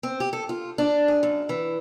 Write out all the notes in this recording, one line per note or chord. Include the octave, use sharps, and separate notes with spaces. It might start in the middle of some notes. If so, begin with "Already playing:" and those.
C4
G4
A4
F4
D4
G#4
F#2
E3